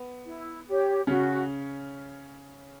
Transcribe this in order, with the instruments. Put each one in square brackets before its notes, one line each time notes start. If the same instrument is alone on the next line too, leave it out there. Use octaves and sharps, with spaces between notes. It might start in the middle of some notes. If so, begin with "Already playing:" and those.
Already playing: [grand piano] B3
[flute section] E4
G4 C#5
[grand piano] C#3 C#4 [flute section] F#4